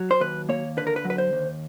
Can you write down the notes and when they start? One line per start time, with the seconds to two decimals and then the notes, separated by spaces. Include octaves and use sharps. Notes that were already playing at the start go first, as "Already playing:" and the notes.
Already playing: F#3
0.11 C5
0.20 D#2 B4
0.49 A#3 C#5
0.77 D3 B4
0.87 A#4
0.96 B4
1.05 F#3
1.10 B4
1.18 C5
1.33 D#2